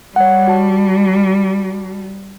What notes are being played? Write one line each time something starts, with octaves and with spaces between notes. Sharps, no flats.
G3 C#5 F#5
F#4 A5